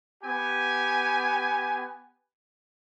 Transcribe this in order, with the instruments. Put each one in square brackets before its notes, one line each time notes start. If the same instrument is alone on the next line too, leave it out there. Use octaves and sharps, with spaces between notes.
[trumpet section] B3 G4 G#5